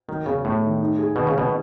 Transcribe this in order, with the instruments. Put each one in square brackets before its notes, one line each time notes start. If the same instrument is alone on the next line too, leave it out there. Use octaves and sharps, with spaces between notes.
[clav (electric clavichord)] D#3 [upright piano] F#3
[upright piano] E2 [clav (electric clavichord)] C#3
[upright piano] E2 [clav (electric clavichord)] A2
[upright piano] D#3
D#4
G#4
[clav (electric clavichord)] B2 [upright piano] D#3
[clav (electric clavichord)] C#3
[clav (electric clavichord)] B2 [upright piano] G#3